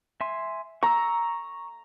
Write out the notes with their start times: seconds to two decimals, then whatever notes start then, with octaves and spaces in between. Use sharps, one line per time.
0.21 E5 G#5 C6
0.83 A#5 C#6 E6